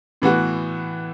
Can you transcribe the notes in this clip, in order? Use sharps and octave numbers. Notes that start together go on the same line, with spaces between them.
A2 E3 B3 F#4